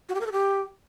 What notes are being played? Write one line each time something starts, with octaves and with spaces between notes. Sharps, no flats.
F#4
G4
A#4
A4
G4